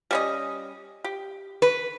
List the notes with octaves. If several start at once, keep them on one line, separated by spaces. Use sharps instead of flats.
G3 C#4 D#5
G4
B4